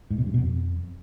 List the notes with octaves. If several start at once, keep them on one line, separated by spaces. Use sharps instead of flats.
G#2
B2
G2
B2
F2